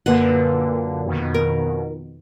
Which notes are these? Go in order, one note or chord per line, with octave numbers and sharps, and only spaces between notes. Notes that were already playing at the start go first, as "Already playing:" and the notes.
F#2 A#2 D3 A#3 B4 F#5
F2 B2 D#3
A#4